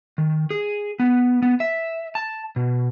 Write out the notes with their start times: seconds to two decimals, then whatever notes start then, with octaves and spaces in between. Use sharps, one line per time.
0.18 D#3
0.51 G#4
1.00 B3
1.42 B3
1.60 E5
2.15 A5
2.56 B2